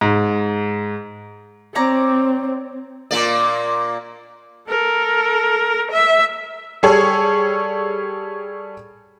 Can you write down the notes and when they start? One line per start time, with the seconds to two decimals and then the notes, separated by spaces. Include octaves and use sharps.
0.01 G#2
1.75 C4 C#5 D5 A#5
3.11 A#2 A#3 D5
4.68 A4 A#4
5.92 E5
6.83 G3 G#4 A4 C#5